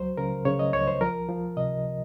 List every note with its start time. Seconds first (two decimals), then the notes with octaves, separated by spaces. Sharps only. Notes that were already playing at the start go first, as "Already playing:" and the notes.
Already playing: C#2 F#3 C5
0.17 C#3 A#4
0.45 C#3 C#5
0.59 D#5
0.73 C#2 C#5
0.87 C5
1.01 F3 A#4
1.29 F3
1.57 C3 D#5